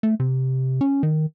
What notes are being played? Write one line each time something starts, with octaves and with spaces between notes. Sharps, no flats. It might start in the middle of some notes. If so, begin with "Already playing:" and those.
A3
C3
C#4
D#3